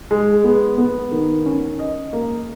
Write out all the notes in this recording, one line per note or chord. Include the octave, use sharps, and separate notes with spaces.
G#3
B3
B3
D#3
C#4
D#5
A#3